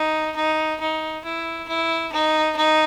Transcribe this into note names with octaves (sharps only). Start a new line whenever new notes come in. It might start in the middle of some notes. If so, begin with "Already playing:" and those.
Already playing: D#4
D#4
D#4
E4
E4
D#4
D#4